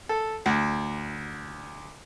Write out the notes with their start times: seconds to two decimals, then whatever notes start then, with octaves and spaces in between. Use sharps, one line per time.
0.09 A4
0.46 D2